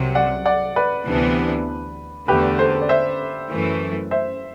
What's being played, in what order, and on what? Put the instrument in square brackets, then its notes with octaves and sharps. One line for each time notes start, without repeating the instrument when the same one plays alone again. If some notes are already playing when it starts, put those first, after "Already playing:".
Already playing: [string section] C2 C3 F#3
[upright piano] D5 F#5
D5 F#5
B4 D5
[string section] D2 C3 E3 B3 D4
[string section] E2 D3 A3 [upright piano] G4 B4
[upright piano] A4 C5
D5
C5 E5
[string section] F#2 E3 A3
[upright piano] C5 E5